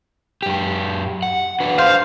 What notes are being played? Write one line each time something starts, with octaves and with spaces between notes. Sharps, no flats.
F#2 G4
F#5
D4 F#4 B4
C5 F5